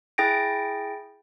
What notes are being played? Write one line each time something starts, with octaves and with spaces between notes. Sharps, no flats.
E4 G#4 G5 A6 A#6 D7